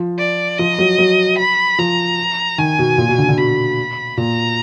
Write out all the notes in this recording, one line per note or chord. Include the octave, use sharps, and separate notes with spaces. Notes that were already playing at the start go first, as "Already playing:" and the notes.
Already playing: F3
D5
F3 D#5
F#3
F#3
B5
F3 A#5
D#3 G#5
B2
A#2
B2
D3
D3
B2 B5
A#2 A#5